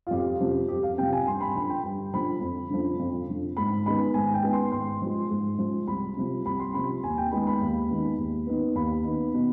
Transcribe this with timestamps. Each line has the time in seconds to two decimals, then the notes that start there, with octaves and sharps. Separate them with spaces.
0.07 F4
0.11 F2 G4
0.40 C3 F3
0.68 F2 G4
0.83 F5
0.98 C3 F3 G5
1.13 G#5
1.26 G2 C6
1.41 B5
1.55 D3 F3 B5
1.70 G5
1.84 G2
2.14 D3 F3 B5
2.41 F2
2.70 D3 F3
3.00 F2
3.29 D3 F3
3.57 G#2 B5
3.86 D#3 G#3 B3 B5
4.14 G#2 G#5
4.34 G5
4.43 D#3 G#3 B3
4.53 C6
4.72 G#2 C6
5.02 F3 G#3
5.31 G#2
5.59 F3 G#3
5.87 C2 B5
6.17 C3 F3
6.46 C2 B5
6.60 C6
6.74 C3 F3 B5
7.04 D#2 G#5
7.18 G5
7.31 D#3 G#3 B3 B5
7.47 B5
7.61 D#2
7.90 D#3 G#3 B3
8.18 D#2
8.47 D#3 B3
8.75 D#2 B5
9.04 D#3 B3
9.34 B2